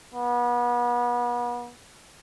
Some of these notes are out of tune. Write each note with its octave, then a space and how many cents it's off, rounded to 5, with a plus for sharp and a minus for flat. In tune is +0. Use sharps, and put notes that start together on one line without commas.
B3 -35